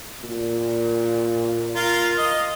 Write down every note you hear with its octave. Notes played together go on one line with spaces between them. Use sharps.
A#2
F4 A#4 F5
D#5